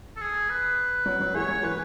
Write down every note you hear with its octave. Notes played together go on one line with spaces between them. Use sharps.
A4
G#4
B4
F#3
F#3
E3 G#3 C#5
F#3
E3 B4